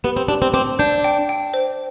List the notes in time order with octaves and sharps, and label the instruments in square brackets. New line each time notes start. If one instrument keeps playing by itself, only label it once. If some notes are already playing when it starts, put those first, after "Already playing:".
[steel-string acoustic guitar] B3 [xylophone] G4
[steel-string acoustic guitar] C4
[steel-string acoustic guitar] D4 [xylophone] G4
[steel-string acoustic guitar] C4
[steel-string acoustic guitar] C4 [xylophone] D6
[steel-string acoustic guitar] D4 [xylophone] G6
[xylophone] G5
G5
C5